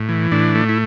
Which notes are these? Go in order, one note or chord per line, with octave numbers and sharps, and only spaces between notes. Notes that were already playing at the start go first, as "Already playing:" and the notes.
Already playing: A2
E3
A2 D4
A3
E4